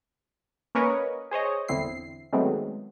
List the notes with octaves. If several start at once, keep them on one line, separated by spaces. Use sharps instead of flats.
A#3 C#4 A#4 B4 C#5 D#5
G#4 C5 C#5 D#5
G1 E2 D3 C4 E4 C7
D#3 F#3 G#3 A3 B3 C4